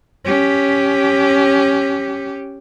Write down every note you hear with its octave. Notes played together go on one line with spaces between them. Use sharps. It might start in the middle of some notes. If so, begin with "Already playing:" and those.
C#4 G4